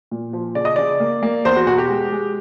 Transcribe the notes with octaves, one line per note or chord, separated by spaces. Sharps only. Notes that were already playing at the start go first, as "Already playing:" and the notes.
A#2
F3
C#3 D5
D#5
C#3 D5
A#3
A#3
E2 C5
F#4
B2 F#4
G4
G#3
G#3